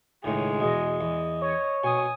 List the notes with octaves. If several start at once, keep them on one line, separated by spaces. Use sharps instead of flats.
C#2 A2 D#3 G#3
E2 B2 D#5
E2
C#5 D#5
B2 G#5 D#6